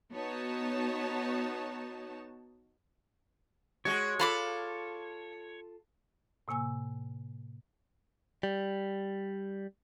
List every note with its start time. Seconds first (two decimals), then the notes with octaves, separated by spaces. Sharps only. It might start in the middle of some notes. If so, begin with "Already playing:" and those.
0.13 B3 D#4 F#4 C#5 A5
3.85 G#3 F#4 C#5
4.19 F4 A4 F5 B5 D6
6.48 A2 C3 A#3 G#5 E6
8.43 G3